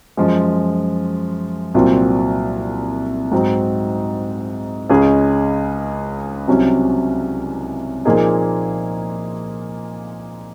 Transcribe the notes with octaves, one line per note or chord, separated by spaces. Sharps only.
F#2 F3 G#3
C2 A#2 F#3 C4 F4
G#2 F#3 C4 D#4
C#2 C#3 G#3 C#4 G#4
C2 C3 F#3 C#4
A#2 F3 A#3 D#4 G#4